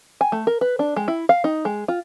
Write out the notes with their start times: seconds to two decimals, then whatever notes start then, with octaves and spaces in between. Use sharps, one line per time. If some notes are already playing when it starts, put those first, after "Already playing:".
0.21 G#5
0.32 A3
0.47 A#4
0.61 B4
0.79 D4
0.96 G#3
1.08 E4
1.29 F5
1.44 D#4
1.65 G#3
1.88 F4